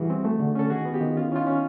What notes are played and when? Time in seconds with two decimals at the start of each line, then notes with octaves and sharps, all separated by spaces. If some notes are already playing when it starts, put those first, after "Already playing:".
Already playing: E3 G3 F#4 G#4
0.10 C4
0.25 A3
0.39 D3
0.55 C#4 A4
0.70 D#3 F#4 G#4
0.85 B3
0.94 F4 G4
1.01 D#3
1.16 C#4 F4
1.27 E4
1.32 C#4 D#4 F4
1.47 C#4